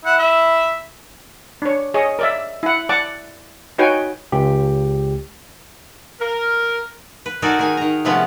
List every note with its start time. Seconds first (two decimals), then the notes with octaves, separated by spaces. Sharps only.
0.05 E4 F#5
0.19 E5
1.62 D4 C#5
1.94 G#4 C#5 D#5
2.19 A#4 D5 E5
2.63 E4 F#5
2.89 D5 F#5 A5 D6
3.78 D#4 F#4 B4 C#5 G5 G#5
4.32 C#2 G4
6.20 A#4
7.26 B4
7.42 D#4 F#4 A4 A#4 D5 G#5
7.59 D#3 G#4 G#5
7.77 D#3 A#5
8.05 C3 F3 G#3 A3 B3 C#4